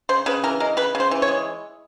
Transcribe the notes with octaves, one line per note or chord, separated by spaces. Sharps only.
C#3 C5
C#3 B4
E3 A#4
G#3 A#4
C#3 B4
C#3
C5
E3
C#5
G#3